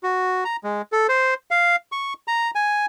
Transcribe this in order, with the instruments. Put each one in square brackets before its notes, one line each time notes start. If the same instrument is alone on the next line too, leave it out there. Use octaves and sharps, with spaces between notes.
[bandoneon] F#4
A#5
G#3
A4
C5
F5
C#6
A#5
G#5